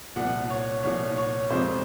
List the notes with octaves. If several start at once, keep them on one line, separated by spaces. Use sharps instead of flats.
C2 A#2 F3 F#5
C#5
C2 A#2 F3 C#5
C#5
F2 C3 F3 G#3 C5